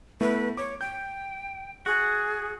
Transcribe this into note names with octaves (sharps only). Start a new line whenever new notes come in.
A3 B3 E4 B4
C#5 D6
G5 G6
F#4 G#4